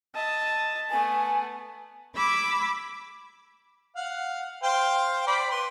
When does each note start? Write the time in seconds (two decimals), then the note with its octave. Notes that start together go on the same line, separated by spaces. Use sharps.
0.15 D#5 E5 A5
0.90 A3 B3 G#5
2.15 B5 D6 E6 G#6
3.96 F5 F#5
4.63 C5 F5 G5
5.27 C5 D5 B5
5.51 B4 C6